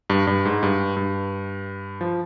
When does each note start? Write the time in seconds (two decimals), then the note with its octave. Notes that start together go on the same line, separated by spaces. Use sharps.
0.10 G2
0.27 G2
0.45 G#2
0.63 G2
0.97 G2
2.01 F3